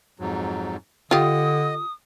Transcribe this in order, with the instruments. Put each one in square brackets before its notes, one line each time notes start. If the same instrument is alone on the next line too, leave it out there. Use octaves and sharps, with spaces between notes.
[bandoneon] F2 G#2 F#3
[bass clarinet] D3 [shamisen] F4 G4 [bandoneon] D#5 [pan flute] D#6